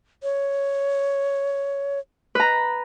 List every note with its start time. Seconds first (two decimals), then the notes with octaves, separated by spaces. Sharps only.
0.23 C#5
2.35 B4 A#5